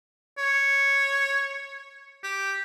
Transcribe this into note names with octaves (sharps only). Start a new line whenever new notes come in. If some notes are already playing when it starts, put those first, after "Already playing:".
C#5
G4